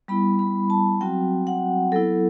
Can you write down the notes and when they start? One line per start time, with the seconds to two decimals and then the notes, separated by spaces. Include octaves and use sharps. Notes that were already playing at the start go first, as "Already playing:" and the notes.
0.08 G3 B3 E4 B5
0.39 B5
0.70 A5
1.01 F#3 C4 F#4 G5
1.47 F#5
1.92 F#3 B3 E4 A4